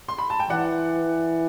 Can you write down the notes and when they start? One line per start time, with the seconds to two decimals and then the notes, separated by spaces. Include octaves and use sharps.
0.08 C6
0.18 B5
0.30 A5
0.40 G5
0.50 E3 D5 F#5